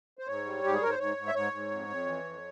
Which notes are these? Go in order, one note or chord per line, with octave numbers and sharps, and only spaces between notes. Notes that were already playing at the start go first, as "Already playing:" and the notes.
C5
G#2 C#5
G3
G#2 G4
G#4
G#2 A#4
C5
G#2 C#5
G#2
E5
G#2 C#5
G#2
F2
F2
E3
F2